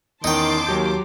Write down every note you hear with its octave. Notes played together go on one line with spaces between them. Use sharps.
E2 D#3 C#4 D#4 G5 A5 C6 D6
D#2 F#3 G4 G6